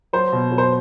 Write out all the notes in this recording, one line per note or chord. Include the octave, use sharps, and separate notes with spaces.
F#3 C5
B2
F#3
C5